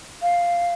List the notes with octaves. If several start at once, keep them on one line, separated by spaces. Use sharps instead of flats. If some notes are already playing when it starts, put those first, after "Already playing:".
F5